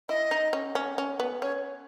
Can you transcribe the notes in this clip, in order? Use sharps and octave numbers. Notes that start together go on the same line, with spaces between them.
E4 D#5
D#4
C#4
C#4
C#4
B3
C#4 C#5